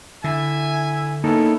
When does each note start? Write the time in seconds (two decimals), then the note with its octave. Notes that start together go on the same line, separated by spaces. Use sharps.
0.24 D3 E4 E5 G#5
1.24 A#3 B3 C#4 D#4 E4 A4